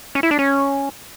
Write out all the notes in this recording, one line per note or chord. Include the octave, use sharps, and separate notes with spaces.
C#4
E4
D4
C#4